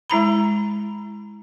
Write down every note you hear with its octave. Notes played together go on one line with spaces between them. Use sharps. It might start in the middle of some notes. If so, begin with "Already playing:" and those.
G#3 E4 A#5 B5